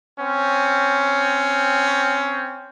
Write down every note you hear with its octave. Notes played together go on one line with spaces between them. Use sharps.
C4 C#4